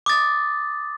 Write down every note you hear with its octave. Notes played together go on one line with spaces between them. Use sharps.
D6 D#6 A6